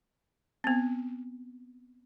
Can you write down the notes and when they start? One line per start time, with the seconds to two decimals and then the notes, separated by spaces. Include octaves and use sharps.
0.64 B3 C4